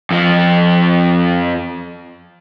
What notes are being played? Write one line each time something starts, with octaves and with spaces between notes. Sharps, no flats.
F2 F3